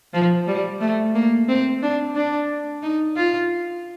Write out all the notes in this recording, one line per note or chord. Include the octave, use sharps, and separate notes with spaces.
F3
G3
A3
A#3
C4
D4
D4
D#4
F4